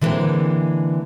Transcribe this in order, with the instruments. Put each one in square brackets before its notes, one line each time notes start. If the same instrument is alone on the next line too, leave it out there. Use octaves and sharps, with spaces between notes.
[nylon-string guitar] D3 E3 G3 G#3 A#3 C4